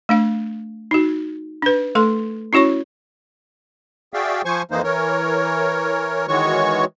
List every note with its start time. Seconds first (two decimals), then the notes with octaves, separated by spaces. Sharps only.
0.09 A3 D4 F5
0.91 D#4 F#4
1.62 D4 B4
1.95 A3 A4 C6
2.53 C#4 E4 F#4 C#5 C#6
4.14 F#4 G#4 D5 E5 F5 G5
4.45 F3 C5 G#5 C#6
4.71 F2 E3 A#3 D#4 C5
4.84 E3 A#4 C#5
6.28 D#3 E3 G#3 F#4 C#5 C#6